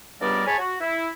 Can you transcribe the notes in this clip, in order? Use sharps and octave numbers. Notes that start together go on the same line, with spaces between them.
C#2 G2 G3 B3 A#4 D5
G#2 G#4 C#5 G#5 A5 B5
F#4
E4